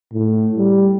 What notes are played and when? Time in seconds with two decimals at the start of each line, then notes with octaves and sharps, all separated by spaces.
0.13 A2
0.56 G3